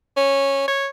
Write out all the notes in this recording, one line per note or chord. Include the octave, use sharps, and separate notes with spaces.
C#4
C#5